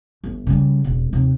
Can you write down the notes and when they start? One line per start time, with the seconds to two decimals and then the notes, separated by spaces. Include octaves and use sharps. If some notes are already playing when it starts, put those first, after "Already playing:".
0.24 G1
0.47 C#3 G3
0.84 E1
1.13 D#2 C3